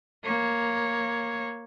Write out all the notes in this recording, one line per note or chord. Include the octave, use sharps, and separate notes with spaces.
A#3 C#5